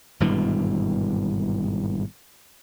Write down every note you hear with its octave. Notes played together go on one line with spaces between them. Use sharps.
G#1 G2 B2 E3